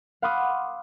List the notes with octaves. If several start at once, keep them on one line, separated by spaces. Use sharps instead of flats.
F5 F#5 B5 C6 D6 D#6